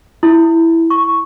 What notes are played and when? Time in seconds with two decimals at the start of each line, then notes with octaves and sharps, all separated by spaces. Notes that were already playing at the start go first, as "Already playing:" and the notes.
0.23 E4
0.90 C#6